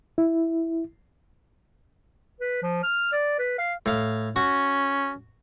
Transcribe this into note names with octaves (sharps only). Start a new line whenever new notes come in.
E4
B4
F3
F6
D5
B4
F5
A2 F5
C#4 F#4